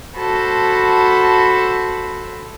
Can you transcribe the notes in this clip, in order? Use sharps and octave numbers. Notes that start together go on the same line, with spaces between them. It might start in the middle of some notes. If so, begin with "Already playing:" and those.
F#4 A4 C5 A5 B5